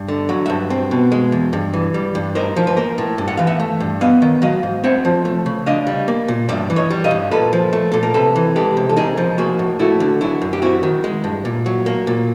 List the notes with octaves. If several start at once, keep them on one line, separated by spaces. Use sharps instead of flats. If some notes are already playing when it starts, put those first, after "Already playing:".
Already playing: G2
D3
F#3 F#5
G2 E5 F#5
C4
B2
G#3
E2
G2
E3
G3
G2
D#4 A#4 C5
F3
B4
A#3 A#4 C5
A2
G2
F#5
E3 F5
E5 F#5
A3
G2
B3 D#5 F5
D#3
F#3 D#5 F5
G#2
C4 E5 F#5
F3
A3
C#3
D4 D#5 F5
G3
A#3
A#2
G2 D5 E5
E3
C#5 D#5
G3
D#5 F5
G2
A#2 A4 B4
F3
A3
A#2 A4
A#4
C3 A4 B4
E3
G#3 G4 A4
C3
A4
D#4 G#4 A#4
F3
A#3 F#4 G#4
A2
A3 E4 F#4
D3
F#3 E4
F#2
G4
C4 E4 F#4
D#3
G#3
G2
A#2
F#3
A#3
A#2